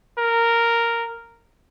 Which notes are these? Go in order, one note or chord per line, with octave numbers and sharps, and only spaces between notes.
A#4